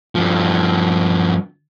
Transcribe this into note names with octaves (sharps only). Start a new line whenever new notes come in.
G2 F3